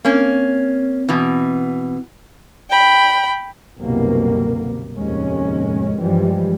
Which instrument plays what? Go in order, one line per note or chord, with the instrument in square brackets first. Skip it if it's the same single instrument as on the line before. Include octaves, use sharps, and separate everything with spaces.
[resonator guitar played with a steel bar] A#3 C#4 [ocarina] C4
[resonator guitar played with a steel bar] B2 E3
[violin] G5 B5
[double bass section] C2 F#2 B2 D3 A#3
F1 D#2 A2 G#3 C#4
G2 E3 F3 G3 G#3